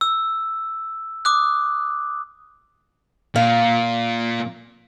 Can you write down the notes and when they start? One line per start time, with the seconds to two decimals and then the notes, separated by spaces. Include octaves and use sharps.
0.01 E6
1.25 D6 D#6 F#6
3.36 A#2 F5